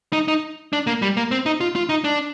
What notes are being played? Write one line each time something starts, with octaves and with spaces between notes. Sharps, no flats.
D#4
D#4
D4
A#3
G3
A#3
C4
D#4
F4
F4
D#4
D4